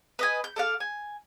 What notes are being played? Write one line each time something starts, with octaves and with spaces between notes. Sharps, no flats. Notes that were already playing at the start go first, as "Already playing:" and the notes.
B4 D#5 G#5
G6
A4 D5 F5
G#5